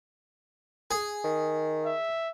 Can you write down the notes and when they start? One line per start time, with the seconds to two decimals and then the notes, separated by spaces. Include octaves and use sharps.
0.91 G#4
1.24 D#3
1.86 E5